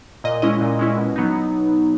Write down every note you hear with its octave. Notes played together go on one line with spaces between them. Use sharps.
A#2 D#5
G#3 C#4 E4 D#5
A#2
G#3 C#4 E4
B2
F#3 B3 D#4